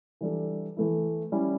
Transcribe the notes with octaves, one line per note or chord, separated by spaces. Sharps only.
E3 G3 D4 A4
E3 A3 E4
G3 C#4 E4